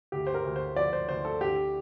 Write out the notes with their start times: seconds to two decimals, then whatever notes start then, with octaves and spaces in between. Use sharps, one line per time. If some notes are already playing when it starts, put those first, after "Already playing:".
0.12 D2 G4
0.27 C5
0.34 A#4
0.44 D2
0.56 C5
0.76 F3 D5
0.93 C5
1.09 D2 C5
1.25 A4
1.41 D3 G4